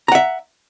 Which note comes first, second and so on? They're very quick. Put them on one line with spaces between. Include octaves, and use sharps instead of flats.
A#5 F#5 E5